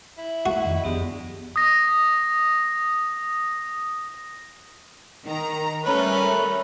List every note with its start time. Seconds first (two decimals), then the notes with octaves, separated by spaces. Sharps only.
0.17 E4
0.46 A3 F#4
0.64 F2 D#3 F3 D#5
0.84 F#1 F2 G#3 B3 D4 G4 D5
1.56 D#6 A#6
5.26 D#3 A#5
5.85 G3 A3 C#4 A#4 B4 B5